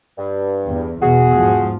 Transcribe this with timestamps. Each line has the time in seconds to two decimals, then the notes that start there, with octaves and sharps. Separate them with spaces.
0.18 G2
0.65 E2
1.01 E2 B2 F#4 G#4
1.38 G#2 F3